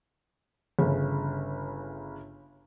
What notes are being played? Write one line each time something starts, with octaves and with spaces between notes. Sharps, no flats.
G1 C#3